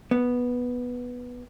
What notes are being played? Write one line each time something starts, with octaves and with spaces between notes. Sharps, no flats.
B3